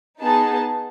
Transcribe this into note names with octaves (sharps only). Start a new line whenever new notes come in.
B3 D#4 G#4 A5